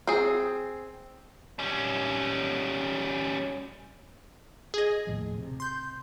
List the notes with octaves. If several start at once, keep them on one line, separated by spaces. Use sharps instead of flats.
C4 G#4
G3 C#4
G#4 D#5
D#2 A2 F3
C3
C6 G6